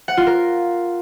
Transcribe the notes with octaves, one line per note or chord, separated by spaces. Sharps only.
F#5
F4
A#4